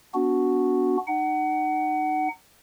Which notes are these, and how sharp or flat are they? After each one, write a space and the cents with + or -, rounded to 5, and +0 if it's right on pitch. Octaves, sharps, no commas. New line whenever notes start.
B3 +0 D4 -20 F#4 -5
D#4 -30 F#5 +25